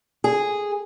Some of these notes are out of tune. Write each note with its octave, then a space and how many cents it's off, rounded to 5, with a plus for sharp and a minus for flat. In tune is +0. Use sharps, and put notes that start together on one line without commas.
G#4 -5